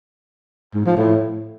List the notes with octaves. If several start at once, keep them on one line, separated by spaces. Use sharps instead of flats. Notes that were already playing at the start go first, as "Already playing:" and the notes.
G#2
F3
A2